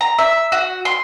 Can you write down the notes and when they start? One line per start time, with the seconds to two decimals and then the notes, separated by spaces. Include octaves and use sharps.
0.01 A#5
0.18 E5
0.52 F#4
0.85 C6